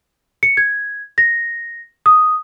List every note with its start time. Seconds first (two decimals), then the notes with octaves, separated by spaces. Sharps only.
0.43 C#7
0.57 G#6
1.18 A#6
2.06 D#6